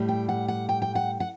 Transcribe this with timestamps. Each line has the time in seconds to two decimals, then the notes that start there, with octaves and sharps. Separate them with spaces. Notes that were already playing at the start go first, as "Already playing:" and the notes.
Already playing: A2 G3
0.09 G5
0.29 F#5
0.48 F#5
0.69 G5
0.82 G5
0.95 F#5
1.20 F#5